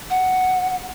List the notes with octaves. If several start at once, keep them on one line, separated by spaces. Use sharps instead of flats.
F#5